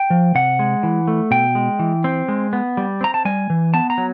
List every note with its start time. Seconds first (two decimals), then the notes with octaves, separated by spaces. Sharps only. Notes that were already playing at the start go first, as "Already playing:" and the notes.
Already playing: G5
0.10 F3
0.35 C3 F#5
0.59 G#3
0.83 E3
1.08 A3
1.31 B2 G5
1.55 G#3
1.79 E3
2.04 C4
2.28 G#3
2.53 B3
2.77 G3
3.01 C4 A#5
3.14 A5
3.25 G3 G#5
3.50 E3
3.74 B3 A5
3.90 A#5
3.98 F#3